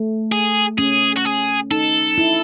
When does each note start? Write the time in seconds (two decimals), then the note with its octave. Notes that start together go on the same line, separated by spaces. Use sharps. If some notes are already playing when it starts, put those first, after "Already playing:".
Already playing: A3
0.32 G#4
0.78 C#4 G#4
1.17 F#4
1.25 G#4
1.71 D#4 A4
2.18 E4